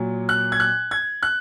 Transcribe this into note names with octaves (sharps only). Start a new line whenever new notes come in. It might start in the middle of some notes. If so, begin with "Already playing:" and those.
Already playing: A#2 F#3
F#6
G#6
F#6
G#6
F#6